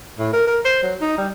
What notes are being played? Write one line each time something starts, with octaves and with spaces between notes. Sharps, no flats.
A2
A#4
A#4
C5
F#3
D#4
G3